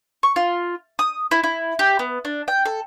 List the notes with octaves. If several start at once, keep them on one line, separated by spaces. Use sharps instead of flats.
C#6
F4
D#6
E4
E4
G4
B3
D4
G5
A4